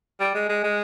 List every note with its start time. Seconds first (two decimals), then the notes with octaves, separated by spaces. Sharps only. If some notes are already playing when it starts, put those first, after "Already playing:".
0.20 G3
0.34 G#3
0.49 G#3
0.64 G#3